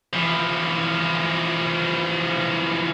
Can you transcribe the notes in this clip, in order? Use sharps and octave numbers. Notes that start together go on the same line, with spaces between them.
E3 F3